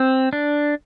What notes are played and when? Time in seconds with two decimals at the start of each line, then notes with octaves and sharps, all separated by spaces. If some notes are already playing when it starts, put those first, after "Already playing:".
Already playing: C4
0.33 D4